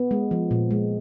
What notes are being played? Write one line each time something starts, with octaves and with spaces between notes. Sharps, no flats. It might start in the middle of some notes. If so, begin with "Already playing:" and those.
Already playing: B3
G#3
F3
A#2
G#3